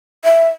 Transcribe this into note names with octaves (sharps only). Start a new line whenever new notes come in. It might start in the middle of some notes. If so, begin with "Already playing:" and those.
E5